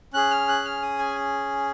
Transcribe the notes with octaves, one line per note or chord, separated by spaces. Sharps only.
C#4 G#4 F#6
F6
F#6
F6
D#6
G#5